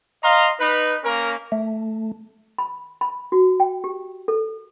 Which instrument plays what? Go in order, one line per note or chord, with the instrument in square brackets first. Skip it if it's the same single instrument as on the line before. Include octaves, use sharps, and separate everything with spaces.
[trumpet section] D#5 F5 A#5 C6
D#4 B4
A#3 C#4 A#4
[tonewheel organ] A3
[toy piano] B5
B5
F#4
G5
G4
A4